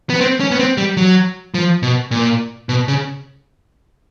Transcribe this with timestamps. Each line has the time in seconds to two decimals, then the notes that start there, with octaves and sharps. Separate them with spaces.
0.10 B3
0.21 C4
0.40 C#4
0.51 B3
0.59 C4
0.77 G3
0.97 F#3
1.54 F3
1.83 B2
2.11 A#2
2.69 B2
2.88 C#3